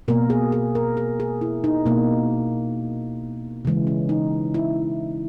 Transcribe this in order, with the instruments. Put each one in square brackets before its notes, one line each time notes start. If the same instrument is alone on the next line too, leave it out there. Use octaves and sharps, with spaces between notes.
[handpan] B2 A#3 A#4
G#4
G#4
A#4
G#4
G#4
E4
D#4
B2 A#3
C#3 E3 G#3
C#4
D#4
E4